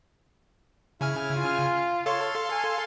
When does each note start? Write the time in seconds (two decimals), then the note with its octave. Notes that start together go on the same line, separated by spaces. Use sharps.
1.01 C#3 E4 G#5 F6
1.36 F4
2.06 A4 C#5 F5 C6
2.51 G#5